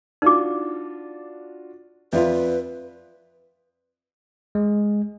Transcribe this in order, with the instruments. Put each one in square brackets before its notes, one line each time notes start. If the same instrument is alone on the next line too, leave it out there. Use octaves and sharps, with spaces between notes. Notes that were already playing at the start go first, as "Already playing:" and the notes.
[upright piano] D4 F4 F#4 [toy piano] D#4 D6
[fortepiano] F2 F4 [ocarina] B4 [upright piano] D5 E5
[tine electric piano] G#3